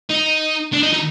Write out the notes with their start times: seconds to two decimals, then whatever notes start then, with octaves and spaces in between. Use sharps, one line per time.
0.10 D#4
0.73 D4
0.83 D#4
0.94 D#4